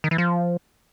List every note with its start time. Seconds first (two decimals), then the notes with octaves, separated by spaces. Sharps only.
0.04 D#3
0.11 E3
0.18 F3